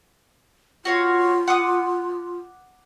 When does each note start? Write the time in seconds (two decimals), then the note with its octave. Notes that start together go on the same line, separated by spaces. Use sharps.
0.85 F4 F#4 C#5 F5
1.48 F#5 D6 D#6